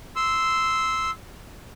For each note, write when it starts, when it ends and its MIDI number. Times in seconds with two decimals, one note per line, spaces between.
0.16 1.10 84
0.16 1.10 88